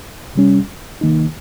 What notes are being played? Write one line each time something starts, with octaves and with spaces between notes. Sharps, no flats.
C3 G3 C#4
C2 C3 D#3 A#3 D#4